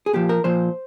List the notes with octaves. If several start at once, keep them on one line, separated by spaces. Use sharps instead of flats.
G#4
A#2 F3 G4
A#4
A#2 F3 C5